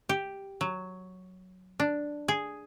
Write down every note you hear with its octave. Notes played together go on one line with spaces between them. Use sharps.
G4
F#3
D4
G#4